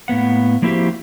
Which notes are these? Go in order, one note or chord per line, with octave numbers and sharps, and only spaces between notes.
A2 A#3 B3 F#5
F3 A#3 C4 E4 F#4 G4